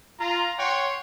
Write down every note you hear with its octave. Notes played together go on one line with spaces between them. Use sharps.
F4 A#5
C#5 F#5 G5 C6